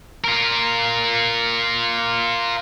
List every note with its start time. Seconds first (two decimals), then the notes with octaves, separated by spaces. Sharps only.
0.24 F4 A#4